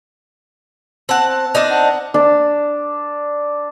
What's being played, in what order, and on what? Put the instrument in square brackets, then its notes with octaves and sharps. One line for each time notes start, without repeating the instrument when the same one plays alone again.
[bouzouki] C4 F#5 [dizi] A5
[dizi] A5
[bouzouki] C4 D4 D#4
[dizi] F#5
[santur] D4